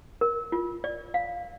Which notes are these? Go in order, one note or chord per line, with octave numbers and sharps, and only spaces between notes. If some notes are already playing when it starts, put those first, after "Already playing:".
A#4
F4
D5
F5